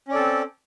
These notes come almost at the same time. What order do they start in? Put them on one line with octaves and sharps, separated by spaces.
C#4 D5 A4 C4